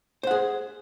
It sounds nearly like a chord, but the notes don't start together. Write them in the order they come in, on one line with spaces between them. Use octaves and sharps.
C5 F#5 G#4